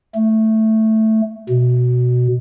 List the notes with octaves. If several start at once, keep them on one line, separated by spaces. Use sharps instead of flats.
A3
B2